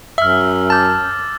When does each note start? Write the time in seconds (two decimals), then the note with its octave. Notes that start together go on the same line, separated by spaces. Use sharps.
0.18 F#2 E5 E6 F6
0.70 A5 D6 G6 A6